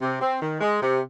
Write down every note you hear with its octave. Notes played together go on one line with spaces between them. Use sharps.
C3
C4
D#3
G#3
C3